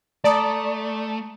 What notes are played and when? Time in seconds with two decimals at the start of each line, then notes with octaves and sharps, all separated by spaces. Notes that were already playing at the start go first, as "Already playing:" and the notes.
0.24 A3 D5 A5 A#5 D#6